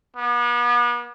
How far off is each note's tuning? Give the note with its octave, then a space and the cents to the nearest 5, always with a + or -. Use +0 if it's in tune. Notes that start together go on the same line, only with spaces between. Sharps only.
B3 -40